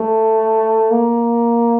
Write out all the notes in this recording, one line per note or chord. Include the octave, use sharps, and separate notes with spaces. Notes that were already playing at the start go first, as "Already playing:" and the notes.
Already playing: A3
A#3